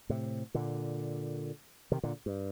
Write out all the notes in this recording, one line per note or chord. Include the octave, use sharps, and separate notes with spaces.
A2 C3
A#2 D3
C3 D#3
A#2 D3
G2